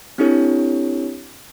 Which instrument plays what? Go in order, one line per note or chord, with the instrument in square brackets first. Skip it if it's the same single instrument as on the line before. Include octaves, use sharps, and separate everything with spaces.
[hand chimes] C4 D4 E4 G4 A4 C#5